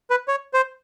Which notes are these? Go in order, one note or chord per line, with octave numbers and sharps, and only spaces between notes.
B4
C#5
C5